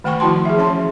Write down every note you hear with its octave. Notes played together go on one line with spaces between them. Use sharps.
D#3 A3 F#5 G5 B5 C#6
F3 E4 F#4 A5 C6
G#4 E5
E3 C#4 C#5 A5 C6